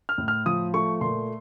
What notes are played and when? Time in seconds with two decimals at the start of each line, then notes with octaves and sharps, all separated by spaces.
0.09 F6
0.18 A2
0.28 F6
0.46 F3 D#6
0.74 A3 C#6
1.01 A#2 C6